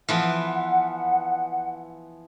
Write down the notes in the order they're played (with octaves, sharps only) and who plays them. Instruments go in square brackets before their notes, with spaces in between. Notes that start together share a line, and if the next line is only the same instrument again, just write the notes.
[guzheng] E3 F3 B3 [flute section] F#5